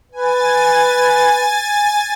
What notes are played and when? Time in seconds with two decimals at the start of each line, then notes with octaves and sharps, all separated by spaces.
0.12 B4 G#5 A6